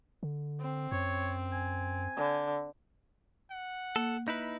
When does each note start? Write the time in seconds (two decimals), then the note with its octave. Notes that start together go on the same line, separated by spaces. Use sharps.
0.23 D3
0.61 C4
0.92 F#2 C#5
1.53 G#5
2.17 D3
3.51 F#5
3.96 A#3 A4
4.28 D#4 E4 B4